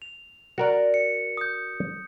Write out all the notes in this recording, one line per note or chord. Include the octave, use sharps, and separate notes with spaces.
F7
F#4 A#4 D5
C#7
D#6 G6